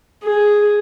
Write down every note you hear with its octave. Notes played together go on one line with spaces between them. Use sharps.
G#4